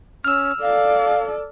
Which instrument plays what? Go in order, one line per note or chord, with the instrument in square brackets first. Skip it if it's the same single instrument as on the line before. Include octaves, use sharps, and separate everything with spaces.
[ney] C#4 [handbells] E6 F6
[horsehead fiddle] A4 D5 [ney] F5